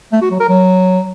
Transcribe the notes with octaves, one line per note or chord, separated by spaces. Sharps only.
A3
F#4
F#3
A#4
F#3